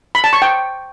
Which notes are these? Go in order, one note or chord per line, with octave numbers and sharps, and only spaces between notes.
B5
A5
C#6
G5